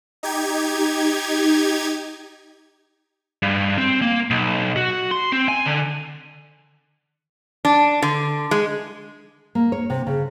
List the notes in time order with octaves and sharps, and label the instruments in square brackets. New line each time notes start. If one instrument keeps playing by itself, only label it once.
[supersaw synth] D#4 G4 G#6
[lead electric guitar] G2
C4
A#3
B1
F#4
C6
C4
G#5
D3
[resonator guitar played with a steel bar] D4
D3
G#3
[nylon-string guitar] A#3
C#5
C3
C#3